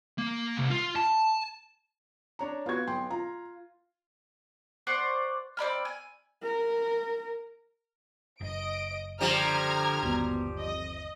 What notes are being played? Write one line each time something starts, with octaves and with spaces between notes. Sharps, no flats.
A#3
C2
F4
A5
D4 C#5 A#5
B3 F4 F#4 G#6
B1 G5 C6
F4 A#5
C5 D5 F#5 C#6
C4 D5 B5 F6
G#5
A#4
F#1 D#5 D7
D3 F3 G3 A#5 F6 G#6
G1 D#2 B2
F2 D#5